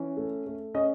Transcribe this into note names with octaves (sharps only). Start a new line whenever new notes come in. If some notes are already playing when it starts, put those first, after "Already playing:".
Already playing: E3 C#4
A3
A3
C#4 D#5